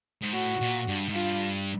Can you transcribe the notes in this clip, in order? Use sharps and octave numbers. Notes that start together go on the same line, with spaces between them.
G#2
A2 F#4
A#2
G2
G#2
G2 F4